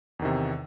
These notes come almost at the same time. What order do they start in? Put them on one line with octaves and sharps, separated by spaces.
E2 D#3 C3